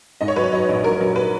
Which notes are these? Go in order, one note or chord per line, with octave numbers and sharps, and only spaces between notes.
G#2 D#5
C#5
F#3 B4
C#5
F#3 D#5
A#1
F#3 A#4
F#3
B4